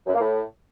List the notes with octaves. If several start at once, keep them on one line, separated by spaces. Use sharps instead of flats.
F#2
A#3
A2